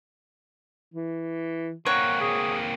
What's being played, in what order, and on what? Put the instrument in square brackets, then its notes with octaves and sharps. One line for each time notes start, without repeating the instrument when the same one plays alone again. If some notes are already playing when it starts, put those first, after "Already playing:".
[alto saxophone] E3
[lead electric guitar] A#3 C4 [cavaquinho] C#5 [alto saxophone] F#5
[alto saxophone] G#4